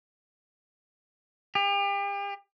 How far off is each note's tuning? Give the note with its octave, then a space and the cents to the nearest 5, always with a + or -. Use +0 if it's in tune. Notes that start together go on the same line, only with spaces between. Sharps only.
G4 +40